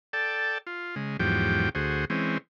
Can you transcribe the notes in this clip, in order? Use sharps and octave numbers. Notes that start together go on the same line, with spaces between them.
A4 D5 G5 A5
F4
C#3 G#3
E2 G#2 F3 F#3 G4 G5
D2 F#4 G#4 C5
E3 G#3 C4 C#4